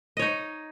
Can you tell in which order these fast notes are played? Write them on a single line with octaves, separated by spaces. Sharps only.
D#5 C#5 D#4